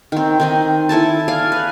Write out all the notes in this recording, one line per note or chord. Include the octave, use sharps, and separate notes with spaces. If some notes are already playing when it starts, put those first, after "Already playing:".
D#3 C4
D#3 C4 D#5
E4 A4 G#5 A5
D5 F5 G#5
B4